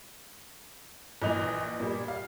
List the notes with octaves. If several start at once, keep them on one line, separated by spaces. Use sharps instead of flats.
A#1 A#2 E3 D#5 F7
A#2 G3
F5